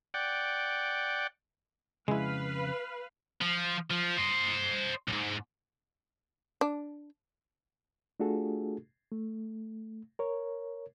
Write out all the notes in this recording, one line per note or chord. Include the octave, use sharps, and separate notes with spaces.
D5 F#5 G5
F2 C#3 G#3 E4 B4 F5
F3
F3
C5 D#5
B1 G#2
D4
A3 D4 F4 F#4 G#4 A4
A3
A#4 C#5